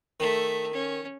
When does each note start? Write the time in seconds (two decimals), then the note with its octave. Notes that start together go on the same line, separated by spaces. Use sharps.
0.20 D#3 A3 E5
0.73 C#4